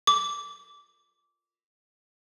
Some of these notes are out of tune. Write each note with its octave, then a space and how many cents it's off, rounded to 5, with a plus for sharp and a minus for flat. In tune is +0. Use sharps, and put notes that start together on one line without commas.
D6 -15